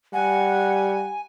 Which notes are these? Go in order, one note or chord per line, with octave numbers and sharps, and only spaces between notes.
G3 F#5 G#5